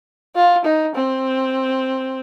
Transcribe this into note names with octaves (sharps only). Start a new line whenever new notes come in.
F4
D#4
C4